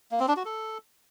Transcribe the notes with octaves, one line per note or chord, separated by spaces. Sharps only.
A#3
C4
D4
F#4
A4